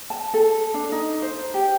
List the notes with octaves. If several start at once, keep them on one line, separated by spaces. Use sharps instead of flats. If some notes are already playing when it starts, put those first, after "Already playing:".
A5
A4
D4
D#4
C5
G4